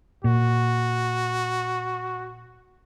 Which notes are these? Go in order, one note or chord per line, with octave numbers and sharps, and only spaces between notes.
A#2 F#4